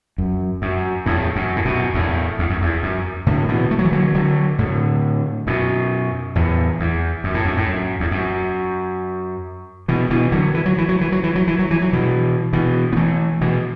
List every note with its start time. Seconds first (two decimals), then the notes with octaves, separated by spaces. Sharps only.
0.18 F#2
0.62 F#2
1.06 E2 A2
1.36 F#2
1.56 A2
1.65 F#2 B2
1.94 E2 A2
2.39 E2
2.50 F#2
2.62 E2
2.83 F#2
3.27 A2 D3
3.48 B2 E3
3.71 A3
3.79 F#3
3.85 E3
3.92 D3 F#3
4.14 D3 F#3
4.59 A2 D3
5.47 F#2 B2
6.35 E2 A2
6.80 E2
7.24 F#2
7.34 A2
7.45 F#2
7.57 A2
7.68 F#2
8.00 E2
8.11 F#2
9.88 B2 E3
10.10 B2 E3
10.32 D3 F#3
10.54 E3
10.66 F#3
10.78 E3
10.89 F#3
11.01 E3
11.12 F#3
11.23 E3
11.36 F#3
11.47 E3
11.59 F#3
11.71 E3
11.82 F#3
11.93 B2 E3
12.53 B2 E3
12.92 B3
12.96 E3 A3
13.41 B2 E3